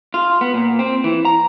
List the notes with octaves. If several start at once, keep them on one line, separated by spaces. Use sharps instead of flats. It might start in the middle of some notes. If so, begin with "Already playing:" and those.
F4
B3
A#2
C4
E3
A#5